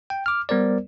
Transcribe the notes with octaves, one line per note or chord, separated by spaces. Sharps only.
G5
D6 F6
G3 B3 A#4 C5 D5